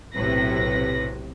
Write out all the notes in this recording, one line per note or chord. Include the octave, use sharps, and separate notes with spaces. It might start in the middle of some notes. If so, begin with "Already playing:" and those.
B1 A2 C3 B4 A#6